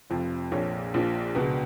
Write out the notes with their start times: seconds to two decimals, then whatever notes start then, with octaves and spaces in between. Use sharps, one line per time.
0.10 F1 F2 F3
0.52 A#1 A#2 F3 C#5
0.94 A#1 A#2 F3
1.35 C#2 B2 B4